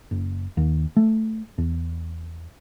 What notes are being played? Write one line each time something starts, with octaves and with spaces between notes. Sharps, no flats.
F#1
D#2
A3
E2